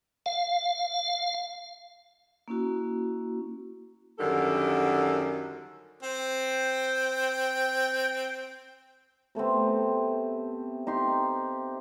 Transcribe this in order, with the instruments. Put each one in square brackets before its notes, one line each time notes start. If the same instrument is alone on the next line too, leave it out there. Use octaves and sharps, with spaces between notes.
[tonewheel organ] F5
[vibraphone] A#3 C#4 E4 F#4
[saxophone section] F#2 D3 D#3 G3 A4
[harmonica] C4 G5
[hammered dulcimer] C3 A3 B3 C4
D#4 G4 C6